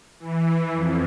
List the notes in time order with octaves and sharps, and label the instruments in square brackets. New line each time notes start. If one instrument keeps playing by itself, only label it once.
[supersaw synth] E3
F2